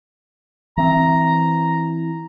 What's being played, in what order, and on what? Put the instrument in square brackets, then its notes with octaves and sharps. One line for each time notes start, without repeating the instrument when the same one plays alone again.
[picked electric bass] E3 C4 [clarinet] A#5